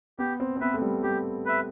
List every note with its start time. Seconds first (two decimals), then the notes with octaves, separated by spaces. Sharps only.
0.19 B3 G4
0.40 C4
0.57 C4
0.61 B3 B4 E5
0.74 A3
0.82 G3
1.03 G3 G4
1.46 B4 E5